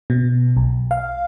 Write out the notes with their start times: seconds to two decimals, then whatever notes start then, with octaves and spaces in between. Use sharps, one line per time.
0.10 B2
0.57 B1
0.91 F5